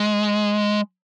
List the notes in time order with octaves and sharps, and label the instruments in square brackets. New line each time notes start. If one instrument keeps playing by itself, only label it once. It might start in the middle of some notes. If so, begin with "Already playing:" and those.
Already playing: [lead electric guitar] G#3